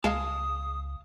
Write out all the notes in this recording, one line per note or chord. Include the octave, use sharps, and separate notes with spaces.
C#2 G#3 F5 A5 D#6